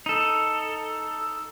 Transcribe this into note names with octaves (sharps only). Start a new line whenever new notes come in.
D#4 A4